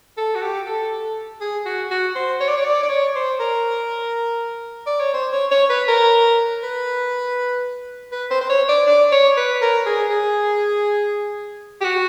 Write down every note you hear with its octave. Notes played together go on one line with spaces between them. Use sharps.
A4
F#4
G4
A4
G#4
F#4
F#4
C5
C#5
D5
C#5
D5
D5
C#5
C5
A#4
D5
C#5
C5
C#5
C#5
B4
A#4
B4
B4
C5
C5
C#5
D5
D5
C#5
B4
A#4
G#4
G#4
G4
F#4